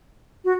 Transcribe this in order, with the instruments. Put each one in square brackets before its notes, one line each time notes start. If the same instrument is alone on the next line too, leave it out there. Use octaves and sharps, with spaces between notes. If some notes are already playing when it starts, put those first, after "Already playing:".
[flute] F#4